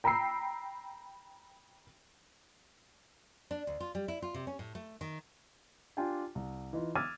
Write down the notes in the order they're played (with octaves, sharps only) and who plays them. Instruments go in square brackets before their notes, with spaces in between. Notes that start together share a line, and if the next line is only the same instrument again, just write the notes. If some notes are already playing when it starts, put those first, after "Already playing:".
[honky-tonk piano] G5 A#5 B5 E6 C7
[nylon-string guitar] D4
D2
F4
G3
E4
F4
C3
C#4
A2
A3
D#3
[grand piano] D4 F4 G4 G5 G#5
C2
E3 D#4 F4
D6 E6 F6 G#6 A6 D#7